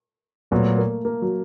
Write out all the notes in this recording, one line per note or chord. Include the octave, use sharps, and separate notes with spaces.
A#2 F#3 A3 B3
A#3
A#3
F#3